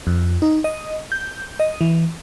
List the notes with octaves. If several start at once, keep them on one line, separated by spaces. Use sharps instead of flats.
F2
D#4
D#5
G6
D#5
E3